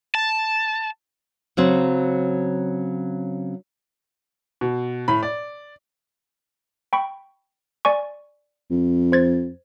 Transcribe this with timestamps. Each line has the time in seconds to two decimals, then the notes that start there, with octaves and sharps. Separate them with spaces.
0.15 A5
1.57 C#3 F#3 C4
4.61 B2
5.08 A2 B5
5.23 D5
6.93 G5 B5 C#6
7.85 D5 G#5 C#6
8.70 F2
9.12 C5 G#6 A6